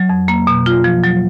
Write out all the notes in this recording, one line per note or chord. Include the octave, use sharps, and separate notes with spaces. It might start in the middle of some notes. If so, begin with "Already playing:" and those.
Already playing: F#3
F2
A#3
B2
F4
F3
F#3